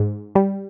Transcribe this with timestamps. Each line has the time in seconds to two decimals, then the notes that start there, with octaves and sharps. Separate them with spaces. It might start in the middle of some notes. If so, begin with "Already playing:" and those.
Already playing: G#2
0.35 G3